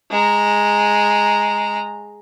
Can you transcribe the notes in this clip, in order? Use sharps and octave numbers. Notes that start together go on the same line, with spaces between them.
G#3 A#5